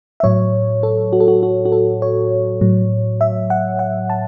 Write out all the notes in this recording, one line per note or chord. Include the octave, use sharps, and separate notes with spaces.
E5
A2 F#3 C#5
A4
F#4
A4
F#4
F#4
F#4
A4
C#5
A2 F#3
E5
F#5
F#5
A5